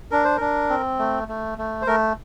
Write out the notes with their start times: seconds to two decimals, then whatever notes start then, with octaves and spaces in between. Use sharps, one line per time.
0.11 D4 A#4
0.24 C5
0.37 D4 A#4
0.70 C4
0.99 A3
1.28 A3
1.58 A3
1.82 C5
1.87 A3 A#4